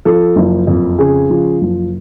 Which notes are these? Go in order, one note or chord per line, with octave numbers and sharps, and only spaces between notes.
F3 A4
F#1
F2
C#3 G#4
F3
F#1